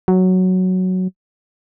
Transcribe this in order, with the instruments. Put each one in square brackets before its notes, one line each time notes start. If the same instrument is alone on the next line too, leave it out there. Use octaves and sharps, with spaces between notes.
[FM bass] F#3